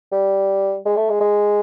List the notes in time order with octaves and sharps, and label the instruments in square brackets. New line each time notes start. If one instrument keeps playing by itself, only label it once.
[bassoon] G3
G#3
A3
G#3
G#3